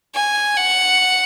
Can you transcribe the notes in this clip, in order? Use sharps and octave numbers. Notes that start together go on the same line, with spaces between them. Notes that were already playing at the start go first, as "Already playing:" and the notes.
G#5
F#5